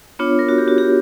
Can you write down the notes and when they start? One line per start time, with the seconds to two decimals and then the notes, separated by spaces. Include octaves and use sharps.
0.19 B3 D4 F4 C#5
0.39 A#4
0.49 F#4
0.58 G4
0.68 F#4
0.78 G4